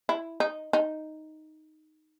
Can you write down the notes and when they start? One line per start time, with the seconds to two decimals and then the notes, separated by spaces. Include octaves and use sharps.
0.09 E4
0.40 D#4
0.73 D#4